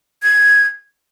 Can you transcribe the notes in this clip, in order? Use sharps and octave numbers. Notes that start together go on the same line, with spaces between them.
G#6